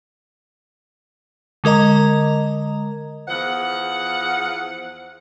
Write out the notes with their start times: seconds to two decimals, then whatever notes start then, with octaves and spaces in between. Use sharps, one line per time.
1.64 D3 G#3 A#4 D#5 A#5
3.28 E2 F3 G#4 F#5